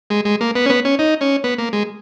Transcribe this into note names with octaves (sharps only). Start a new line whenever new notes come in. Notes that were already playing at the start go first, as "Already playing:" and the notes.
G#3
G#3
A#3
B3
C#4
B3
C#4
D#4
C#4
B3
A#3
G#3